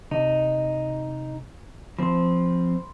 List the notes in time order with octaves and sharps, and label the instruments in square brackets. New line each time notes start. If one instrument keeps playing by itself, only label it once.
[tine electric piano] C3 [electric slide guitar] D#4
[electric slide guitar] F3 C4 [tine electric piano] B5 C6